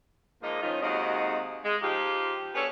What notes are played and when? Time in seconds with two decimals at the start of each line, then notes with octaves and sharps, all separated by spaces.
0.43 G#2 F3 A#3 D#4 D#5
0.62 D#3 F3 G#3 C#4 D#4 F4
0.82 D#2 C3 G#3 F#4 D#5 F5
1.64 G#3
1.82 F3 D#4 F4 G4
2.55 B3 D4 G#4 A4 C#5